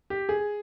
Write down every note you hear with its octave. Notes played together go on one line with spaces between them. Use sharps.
G4
G#4